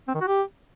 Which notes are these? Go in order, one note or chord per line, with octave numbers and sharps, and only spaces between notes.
C4
D#3
F#4
G4